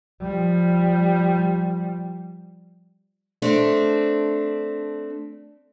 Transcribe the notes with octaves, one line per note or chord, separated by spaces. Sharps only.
F3 G3
A3 C4 D4